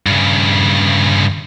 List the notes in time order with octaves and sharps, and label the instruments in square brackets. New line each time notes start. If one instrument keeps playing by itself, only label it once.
[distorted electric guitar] G2 C#3